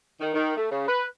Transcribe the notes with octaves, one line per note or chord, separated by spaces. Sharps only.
D#3
D#3
A3
C#3
B4